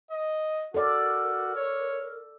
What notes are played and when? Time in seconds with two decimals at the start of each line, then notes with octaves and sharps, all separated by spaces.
0.11 D#5
0.74 F#4 A4 A#4 D5
1.56 C#5